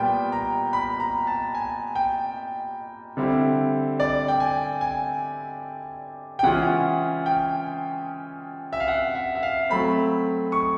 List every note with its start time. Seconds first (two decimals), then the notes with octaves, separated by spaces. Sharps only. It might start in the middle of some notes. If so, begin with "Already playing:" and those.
Already playing: A#2 G3 B3 G5
0.32 A#5
0.73 B5
1.00 A#5
1.27 A5
1.55 G#5
1.95 G5
3.17 D3 G3 C4 E4
4.00 D5
4.28 G5
4.40 G#5
4.81 G#5
6.39 G5
6.43 C#3 E3 G#3 C#4 F4 F#5
7.26 G5
8.73 E5
8.80 F5
8.88 F#5
9.15 E5
9.35 E5
9.43 F5
9.69 F#3 A3 C4 B5
10.52 C#6